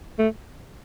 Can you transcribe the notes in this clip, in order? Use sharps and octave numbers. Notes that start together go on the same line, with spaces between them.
A3